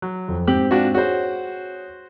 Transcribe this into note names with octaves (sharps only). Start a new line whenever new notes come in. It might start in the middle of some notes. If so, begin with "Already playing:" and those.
F#3
F2
G#2 C4 G4 F#7
D4 F4 F#4
F#4 G#4 C5 C#5